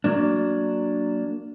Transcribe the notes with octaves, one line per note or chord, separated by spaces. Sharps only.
F#3 A#3 D4